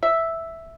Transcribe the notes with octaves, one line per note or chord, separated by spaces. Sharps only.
E5